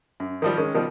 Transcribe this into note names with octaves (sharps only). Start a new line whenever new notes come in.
F#2
D#3 F3 G3
D#3 G#3 C#4
B2 D#3 F3 G3